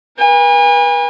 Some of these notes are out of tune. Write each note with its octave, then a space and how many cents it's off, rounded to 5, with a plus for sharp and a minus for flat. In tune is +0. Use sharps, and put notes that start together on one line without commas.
B4 -40 G#5 -40